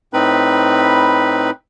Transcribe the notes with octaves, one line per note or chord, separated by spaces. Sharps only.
A2 C4 D#4 B4 B5